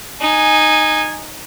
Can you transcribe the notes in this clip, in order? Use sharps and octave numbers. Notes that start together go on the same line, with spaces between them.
D#4 G#5